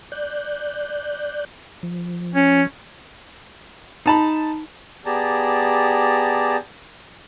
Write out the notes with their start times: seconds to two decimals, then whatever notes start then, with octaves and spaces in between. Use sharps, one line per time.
0.12 D5 F#6 G6
1.83 F3
2.35 C#4
4.06 D#4 A5 B5
5.06 B3 G4 G#4 D5 A5 A#5